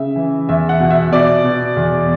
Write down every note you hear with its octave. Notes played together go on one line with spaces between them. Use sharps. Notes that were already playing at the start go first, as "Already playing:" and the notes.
Already playing: C#3 E5
E3
E2 E5
F#5
B2
E5
B2 D5
B2
E2